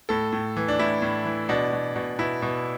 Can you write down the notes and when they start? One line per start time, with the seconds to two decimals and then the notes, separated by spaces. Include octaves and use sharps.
0.09 A2 A4
0.33 A2
0.57 E3
0.68 D4
0.79 A2 E4
1.02 A2
1.25 E3
1.49 B2 D4
1.73 B2
1.96 B2
2.19 B2 E4
2.42 B2